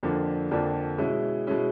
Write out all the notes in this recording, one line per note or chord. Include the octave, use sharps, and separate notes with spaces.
F2 D3 F3 A#3 D4
F2 D3 F3 A#3 D4
B2 G#3 C#4 E4
B2 G#3 C#4 E4